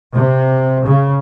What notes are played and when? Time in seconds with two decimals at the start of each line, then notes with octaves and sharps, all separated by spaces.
0.13 C3
0.86 C#3